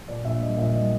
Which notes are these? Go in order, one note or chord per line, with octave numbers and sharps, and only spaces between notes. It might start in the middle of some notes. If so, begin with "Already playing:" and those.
A#2 D5
A#1 E5
G3 D#5
A#2 E5
G3 D#5